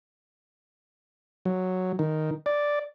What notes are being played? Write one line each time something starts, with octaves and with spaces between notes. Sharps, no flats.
F#3
D#3
D5